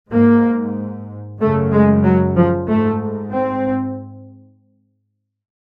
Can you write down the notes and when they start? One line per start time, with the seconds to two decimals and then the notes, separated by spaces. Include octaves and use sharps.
0.11 G#2 A#3
1.40 F#2 C#3 A3
1.71 G#3
2.04 F#3
2.36 F3
2.68 G#2 A3
3.32 C4